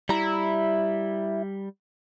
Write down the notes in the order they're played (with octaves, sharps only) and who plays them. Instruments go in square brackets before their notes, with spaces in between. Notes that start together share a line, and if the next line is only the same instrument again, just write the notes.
[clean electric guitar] G3 A#5 [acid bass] E4